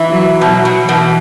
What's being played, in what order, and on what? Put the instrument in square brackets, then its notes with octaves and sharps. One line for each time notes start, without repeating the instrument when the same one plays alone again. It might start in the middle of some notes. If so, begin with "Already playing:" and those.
Already playing: [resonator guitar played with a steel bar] E3
[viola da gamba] F#3
[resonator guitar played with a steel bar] B2 [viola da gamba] F#3
[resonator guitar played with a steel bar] B2
[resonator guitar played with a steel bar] B2 [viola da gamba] E3